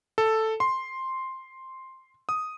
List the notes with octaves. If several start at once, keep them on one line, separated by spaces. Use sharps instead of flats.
A4
C6
D#6